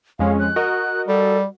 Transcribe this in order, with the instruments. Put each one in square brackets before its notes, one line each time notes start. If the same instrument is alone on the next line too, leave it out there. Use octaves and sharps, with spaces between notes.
[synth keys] F2 G#3 C#4 [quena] F5
[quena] F#6
[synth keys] F#4 A#4 D#5
[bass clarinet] G3 [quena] A4